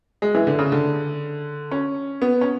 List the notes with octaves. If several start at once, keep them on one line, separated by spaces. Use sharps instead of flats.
G#3
E3
D3
C#3
D3
C#4
B3
C#4